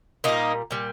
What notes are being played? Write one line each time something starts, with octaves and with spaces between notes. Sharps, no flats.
A#2 G3 A#3 D#4
A#2 G3